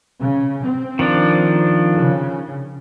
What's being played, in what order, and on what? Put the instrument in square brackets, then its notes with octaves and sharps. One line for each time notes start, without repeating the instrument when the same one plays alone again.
[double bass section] C#3
C4
[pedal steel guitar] D#3 F3 D4
[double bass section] C#3